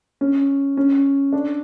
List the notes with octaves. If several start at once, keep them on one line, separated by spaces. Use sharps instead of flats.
C#4
C#4
D4